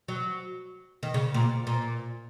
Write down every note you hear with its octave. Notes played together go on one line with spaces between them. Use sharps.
F#3
D#3
C#3
A#2
A#2